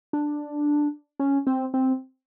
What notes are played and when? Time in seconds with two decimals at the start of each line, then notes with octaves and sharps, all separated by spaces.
0.13 D4
1.20 C#4
1.47 C4
1.74 C4